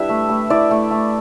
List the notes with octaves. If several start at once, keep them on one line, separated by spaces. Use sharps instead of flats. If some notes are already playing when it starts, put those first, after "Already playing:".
Already playing: G3 D4 E4 B4 E5
A3
A3
E4 D5
A3
A3